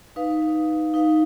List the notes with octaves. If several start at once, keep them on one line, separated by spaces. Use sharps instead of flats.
D#4 B4 F5
D#4 B4 F5